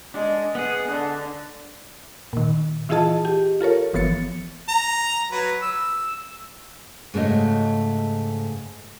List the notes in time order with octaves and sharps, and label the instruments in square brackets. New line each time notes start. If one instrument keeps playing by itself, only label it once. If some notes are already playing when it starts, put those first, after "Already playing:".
[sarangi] G#3 [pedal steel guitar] D4
[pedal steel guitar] B3 G#4 [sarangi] F#5
[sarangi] D3 [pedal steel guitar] F#6
[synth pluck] A#2 D#3
E3 E4 F4 G#4 D#5 A5
G4
F4 A4 A#4 C#5
G1 E3 F3 B3 A6 C#7
[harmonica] A#5
F#3 B4
E6
[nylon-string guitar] G#2 C#3 A3 F#4 C#5 D#5